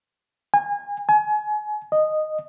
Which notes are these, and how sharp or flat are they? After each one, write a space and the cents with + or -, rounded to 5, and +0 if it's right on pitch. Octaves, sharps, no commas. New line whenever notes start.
G#5 -30
G#5 +30
D#5 -10